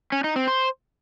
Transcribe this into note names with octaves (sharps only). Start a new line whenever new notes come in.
C#4
D#4
C4
C5